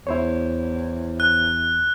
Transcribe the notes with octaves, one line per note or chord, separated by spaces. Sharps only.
E2 E4 C5 C#5
F#6